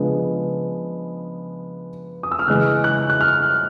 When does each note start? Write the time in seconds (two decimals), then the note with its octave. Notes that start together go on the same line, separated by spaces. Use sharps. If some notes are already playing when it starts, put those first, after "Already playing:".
Already playing: C#3 F3 G#3 B3 D4
2.23 D#6
2.31 E6
2.39 F6
2.47 C#3 E3 G#3 F#6
2.84 F#6
3.10 F#6
3.21 F6